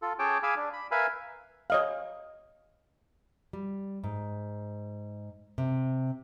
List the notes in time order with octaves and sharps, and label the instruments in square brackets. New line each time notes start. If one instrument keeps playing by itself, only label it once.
[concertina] F4 A4
C#4 G#4 C#5 G5 A5 D6
G#4 F5 G#5 B5 D6 E6
D4
B5
A#4 B4 E5 F5 G#5 B5
[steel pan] C#5 D#5 F5
[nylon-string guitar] G3
G#2
C3